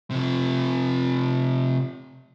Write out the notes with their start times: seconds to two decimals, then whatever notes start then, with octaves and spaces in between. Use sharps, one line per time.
0.11 C3 F3